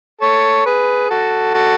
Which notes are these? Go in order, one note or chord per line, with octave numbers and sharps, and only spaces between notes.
A4 C#5
G#4 B4
F#4 A4
F#4 A4